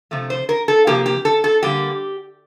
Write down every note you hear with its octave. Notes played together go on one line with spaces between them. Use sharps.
C3 F3 A3
C5
A#4
A4
C3 F3 A#3 G4
G4
A4
A4
D3 G3 A#3 G4